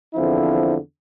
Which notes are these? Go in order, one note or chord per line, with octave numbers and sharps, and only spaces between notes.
E2 D3 F3 C4 E4